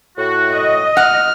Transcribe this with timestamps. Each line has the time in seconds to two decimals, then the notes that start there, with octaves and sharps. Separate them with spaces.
0.18 A2 F#4
0.52 D#5
0.97 F#5 F6